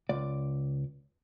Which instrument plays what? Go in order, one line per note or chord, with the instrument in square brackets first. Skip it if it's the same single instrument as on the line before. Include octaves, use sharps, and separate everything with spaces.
[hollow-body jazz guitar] C#2 D5